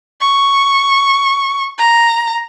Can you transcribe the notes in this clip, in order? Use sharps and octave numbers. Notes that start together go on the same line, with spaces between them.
C#6
A#5